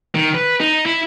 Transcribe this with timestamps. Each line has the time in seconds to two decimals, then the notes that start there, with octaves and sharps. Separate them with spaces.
0.15 D#3
0.34 B4
0.60 D#4
0.86 E4